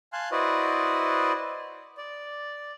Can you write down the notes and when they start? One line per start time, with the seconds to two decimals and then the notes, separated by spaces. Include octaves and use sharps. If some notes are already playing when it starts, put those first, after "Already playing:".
0.13 F5 G#5 A5 C6 F#6
0.31 E4 F#4 B4 C5 D5 D#5
1.97 D5